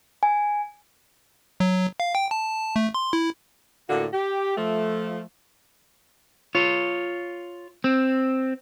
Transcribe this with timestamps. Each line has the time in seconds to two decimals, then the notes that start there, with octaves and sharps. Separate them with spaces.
0.23 G#5
1.60 F#3
2.00 F5
2.15 G5
2.31 A5
2.76 A3
2.94 C6
3.13 E4
3.90 A2 D3 A#3 F4 F#4
4.13 G4
4.57 F3 A3
6.55 F4 C#5
7.84 C4